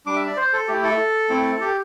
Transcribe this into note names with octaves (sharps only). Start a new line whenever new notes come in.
G3 D4 D6
E5
D5
C5
A4
A3 E4 G4
A4
A3 C4 E4
G4